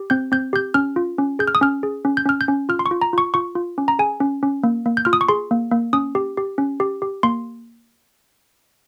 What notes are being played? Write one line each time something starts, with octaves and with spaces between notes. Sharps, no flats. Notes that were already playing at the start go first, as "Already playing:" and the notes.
Already playing: G4
C4 G6
C4 G6
G4 G6
C#4 F6
F4
C#4
G#4 G6
F6
D#6
C#4 F6
G#4
C#4
G6
C#4 F6
G6
C#4
F4 F6
C6
C#6
F4
A#5
F4 C#6
F4 C#6
F4
C#4
A#5
G#4 G#5
C#4
C#4
A#3
A#3
G6
F4 F6
D#6
C#6
G#4 C6
A#3
A#3
C#4 D#6
G4
G4
C#4
G4
G4
A#3 C6